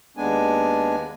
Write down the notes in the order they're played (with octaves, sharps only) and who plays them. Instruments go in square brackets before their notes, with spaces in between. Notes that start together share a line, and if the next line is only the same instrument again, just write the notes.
[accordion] D#2 G#3 B3 D4 G#5